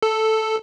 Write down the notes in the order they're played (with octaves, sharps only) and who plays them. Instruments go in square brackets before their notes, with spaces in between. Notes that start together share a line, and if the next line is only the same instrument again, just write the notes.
[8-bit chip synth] A4